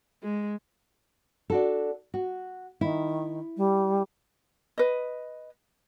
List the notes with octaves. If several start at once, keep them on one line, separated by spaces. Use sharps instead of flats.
G#3
D4 F#4 A4
F#4
D#3 E4
G3
B4 D#5